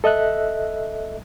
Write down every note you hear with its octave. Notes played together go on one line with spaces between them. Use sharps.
A4 D#5 E5 F#6